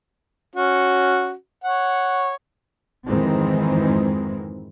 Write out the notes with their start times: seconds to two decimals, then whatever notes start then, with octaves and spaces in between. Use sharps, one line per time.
0.56 C#4 F#4
1.64 C#5 F#5
3.07 F2 G#2 D#3 E3 G#3 C4